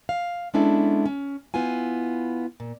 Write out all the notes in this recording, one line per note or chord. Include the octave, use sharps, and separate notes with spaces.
F5
G#3 B3 C#4 D4 E4 A4
C#4
B3 E4 F4 G#5
A#2